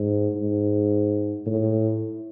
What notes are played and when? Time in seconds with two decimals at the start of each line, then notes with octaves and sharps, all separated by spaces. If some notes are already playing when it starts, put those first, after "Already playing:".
Already playing: G#2
0.35 G#2
1.46 A2